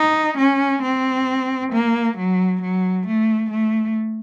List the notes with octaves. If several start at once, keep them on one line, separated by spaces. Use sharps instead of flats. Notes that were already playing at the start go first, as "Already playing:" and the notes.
Already playing: D#4
C#4
C4
A#3
F#3
F#3
A3
A3